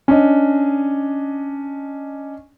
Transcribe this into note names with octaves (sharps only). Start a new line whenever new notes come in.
C#4 D4 D#5